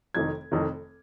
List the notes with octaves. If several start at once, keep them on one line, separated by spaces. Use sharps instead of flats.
F1 F2 D#3 G#6
F1 F2 D#3